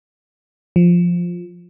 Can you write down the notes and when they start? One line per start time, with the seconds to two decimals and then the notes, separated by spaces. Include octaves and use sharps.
0.76 F3